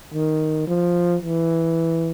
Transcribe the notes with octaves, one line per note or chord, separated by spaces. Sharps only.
D#3
F3
E3